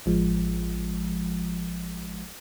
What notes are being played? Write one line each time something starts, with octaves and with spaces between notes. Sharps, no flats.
A1 F3 G#3